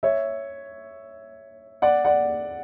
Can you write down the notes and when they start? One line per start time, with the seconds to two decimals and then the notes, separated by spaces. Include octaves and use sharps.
0.03 C#5 E5
1.82 D5 F#5
2.05 D5 F#5